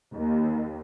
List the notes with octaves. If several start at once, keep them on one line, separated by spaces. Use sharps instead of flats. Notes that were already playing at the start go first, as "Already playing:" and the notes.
D#2